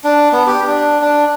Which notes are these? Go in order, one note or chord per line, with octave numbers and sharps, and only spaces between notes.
D4
B3
G4
D4
D4